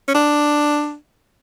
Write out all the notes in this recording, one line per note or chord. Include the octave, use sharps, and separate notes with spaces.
C#4
D4